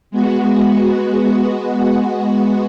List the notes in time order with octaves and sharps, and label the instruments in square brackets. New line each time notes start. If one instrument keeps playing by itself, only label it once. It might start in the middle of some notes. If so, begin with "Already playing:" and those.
[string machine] G#3 B3 F#4